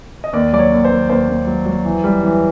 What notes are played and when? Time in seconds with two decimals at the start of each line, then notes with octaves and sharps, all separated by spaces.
0.24 D#5
0.33 D#2 D5
0.53 F#3 D5
0.59 C#5
0.72 D#2
0.85 C5
0.90 D#2
1.09 D#2 C5
1.28 D#2
1.47 F#3
1.66 F#3
1.85 E3
2.04 G3
2.23 E3